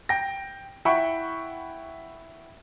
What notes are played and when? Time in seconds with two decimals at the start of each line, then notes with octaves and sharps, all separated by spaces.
0.09 G5 A#6
0.85 E4 E5 F#5 G5 B5 C#6